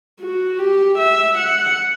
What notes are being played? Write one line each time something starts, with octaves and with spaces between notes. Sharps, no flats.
F#4
G4
E5
F#5